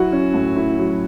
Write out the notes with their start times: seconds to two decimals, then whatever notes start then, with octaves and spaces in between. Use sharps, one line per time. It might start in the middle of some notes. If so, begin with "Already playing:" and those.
Already playing: F#3 E4 F#4
0.12 C#4
0.34 A2
0.56 E4
0.79 F#3